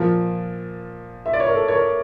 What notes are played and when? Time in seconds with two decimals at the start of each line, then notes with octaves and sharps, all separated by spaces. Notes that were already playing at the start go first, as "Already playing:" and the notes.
Already playing: A#2 F3 A#4
1.26 E5
1.33 D5
1.40 C#5
1.48 A#4
1.55 A4
1.68 C#5
1.76 A#4